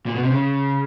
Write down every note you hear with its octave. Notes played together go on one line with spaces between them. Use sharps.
A#2
B2
C3
C#3